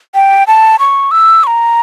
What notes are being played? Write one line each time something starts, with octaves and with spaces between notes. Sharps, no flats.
G5
A5
C#6
E6
C#6
A#5